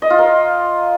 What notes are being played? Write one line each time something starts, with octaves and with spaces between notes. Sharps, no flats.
D#5
F4
A#4